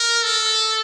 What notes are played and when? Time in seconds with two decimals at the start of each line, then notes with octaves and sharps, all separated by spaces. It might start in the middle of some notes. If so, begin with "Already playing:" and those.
Already playing: A#4
0.23 A4